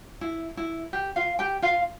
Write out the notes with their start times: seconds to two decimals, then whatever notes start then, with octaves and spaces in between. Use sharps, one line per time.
0.21 E4
0.57 E4
0.93 G4
1.16 F4 F5
1.39 G4 G5
1.62 F4 F5